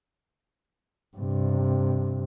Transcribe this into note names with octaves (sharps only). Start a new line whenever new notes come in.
G2 C3